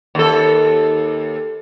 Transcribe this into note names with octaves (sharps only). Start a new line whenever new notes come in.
D#2 A4